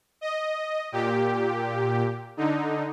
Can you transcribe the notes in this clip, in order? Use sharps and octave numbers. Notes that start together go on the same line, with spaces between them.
D#5
A#2 G4
D3 D#4